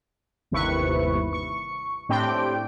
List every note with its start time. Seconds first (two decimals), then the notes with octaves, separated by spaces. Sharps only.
0.51 G1 D#2 C3 E4 B4 C#6
1.33 C#6
2.09 A2 C4 D4 G4 G5